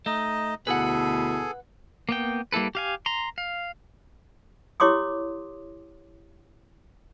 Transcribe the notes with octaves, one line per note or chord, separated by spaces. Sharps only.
A3 D#4 D#5
D2 B2 E4 G#4 A4 B4 F#5 G#5
A#3 B3 G5
G3 A#3 E4 A4 B4
G4 F5 G#5
A#5 C6
F5
E4 G4 C#5 C6 D6 D#6